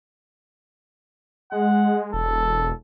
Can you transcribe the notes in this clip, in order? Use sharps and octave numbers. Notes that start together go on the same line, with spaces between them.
G#3 F#5
E1 A4